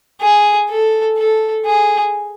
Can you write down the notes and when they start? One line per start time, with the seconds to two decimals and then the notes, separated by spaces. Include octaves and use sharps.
0.21 G#4
0.70 A4
1.18 A4
1.66 G#4